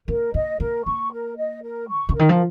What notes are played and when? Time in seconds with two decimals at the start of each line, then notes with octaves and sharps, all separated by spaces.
0.08 A#3 A#4
0.34 A#3 D#5
0.60 A#3 A#4
0.86 A#3 C#6
1.12 A#4
1.37 D#5
1.63 A#4
1.88 C#6
1.98 A#2
2.09 C#3
2.15 D#3 A#4
2.29 F3